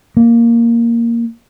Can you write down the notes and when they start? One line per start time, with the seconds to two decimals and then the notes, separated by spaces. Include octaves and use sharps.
0.17 A#3